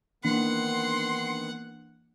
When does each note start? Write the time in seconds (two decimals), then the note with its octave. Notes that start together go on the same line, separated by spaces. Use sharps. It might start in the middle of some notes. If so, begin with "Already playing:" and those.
0.24 D#3 E3 A#3 B3 D4 F#5 C6